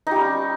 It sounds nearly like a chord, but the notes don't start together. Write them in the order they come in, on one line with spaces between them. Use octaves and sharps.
D#4 G4 G3 C#4